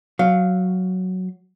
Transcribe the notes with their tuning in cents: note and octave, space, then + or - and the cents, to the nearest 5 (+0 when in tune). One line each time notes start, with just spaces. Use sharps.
F#3 +0 F5 +0